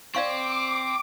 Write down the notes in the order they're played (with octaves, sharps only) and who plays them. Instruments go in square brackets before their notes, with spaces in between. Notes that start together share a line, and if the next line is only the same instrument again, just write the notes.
[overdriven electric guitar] C4 [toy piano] D5 F5 C#6 [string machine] D6